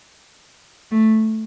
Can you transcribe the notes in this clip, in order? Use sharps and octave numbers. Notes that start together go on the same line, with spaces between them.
A3